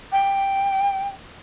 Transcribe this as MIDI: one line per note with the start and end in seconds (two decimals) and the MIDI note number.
0.12 1.07 79